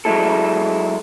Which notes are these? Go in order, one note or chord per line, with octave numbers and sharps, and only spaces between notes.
F#3 G#3 E4 A4